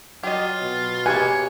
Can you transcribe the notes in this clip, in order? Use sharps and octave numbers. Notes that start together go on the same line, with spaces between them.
F#3 F4 G4 D#5
B2
A#3 G4 G#4 B4 C#5 G#5